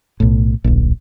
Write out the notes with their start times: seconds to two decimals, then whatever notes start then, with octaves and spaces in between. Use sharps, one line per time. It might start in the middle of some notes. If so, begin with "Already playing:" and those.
0.20 B1 A2
0.64 D1 A#1